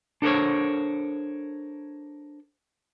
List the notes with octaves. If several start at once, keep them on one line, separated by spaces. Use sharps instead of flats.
D4 A4 A#4 C5 C#5